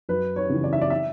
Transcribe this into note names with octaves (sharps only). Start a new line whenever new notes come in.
F#2 B4
C#5
C#3 E3
D5
E5
D5
E5